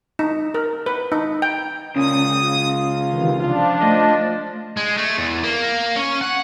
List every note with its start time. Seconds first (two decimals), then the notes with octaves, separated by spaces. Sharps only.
0.19 D#4
0.54 A#4
0.86 B4
1.12 D#4
1.42 G5
1.96 C#2 A#2 C#4 D#6
2.42 F4
3.11 C3 D#3 E3
3.39 F3 D4 F4
3.83 A3 D#5
4.77 G#3
4.98 A3
5.18 E2
5.44 A#3
5.96 C#4
6.21 F#5